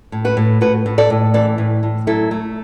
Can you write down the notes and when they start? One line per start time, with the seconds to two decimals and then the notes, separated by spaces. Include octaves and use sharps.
0.12 A2
0.25 F#4 B4
0.37 A2
0.61 A2 F#4 B4
0.86 A2
0.98 A4 D5
1.10 A2
1.34 E3 A4 D5
1.58 A2
1.83 A2
2.07 F#3 E4 A4
2.31 A3